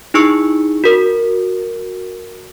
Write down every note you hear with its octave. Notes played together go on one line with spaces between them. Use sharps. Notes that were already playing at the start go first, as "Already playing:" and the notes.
D#4 E4 G#4 C#6 E6 C#7
F#4 A#4